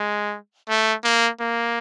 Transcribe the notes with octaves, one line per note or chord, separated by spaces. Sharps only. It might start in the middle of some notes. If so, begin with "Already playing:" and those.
Already playing: G#3
A3
A#3
A#3